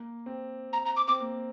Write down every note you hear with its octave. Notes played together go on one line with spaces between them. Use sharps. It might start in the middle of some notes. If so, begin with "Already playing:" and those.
Already playing: A#3
C4
A#5
A#5
D6
C4 D6
A#3